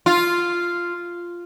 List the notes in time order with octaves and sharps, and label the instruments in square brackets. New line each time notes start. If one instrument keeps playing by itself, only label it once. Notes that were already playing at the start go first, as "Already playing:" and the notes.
[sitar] F4